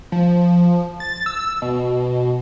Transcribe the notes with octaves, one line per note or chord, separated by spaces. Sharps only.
F3
A6
E6
B2